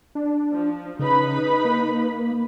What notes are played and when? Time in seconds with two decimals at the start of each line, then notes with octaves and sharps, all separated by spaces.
0.15 D4
0.53 F3
0.99 C#3 D#4 B4 B5
1.65 A#3